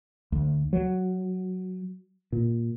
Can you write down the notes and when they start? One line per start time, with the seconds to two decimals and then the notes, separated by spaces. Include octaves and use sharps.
0.32 D2
0.73 F#3
2.32 A#2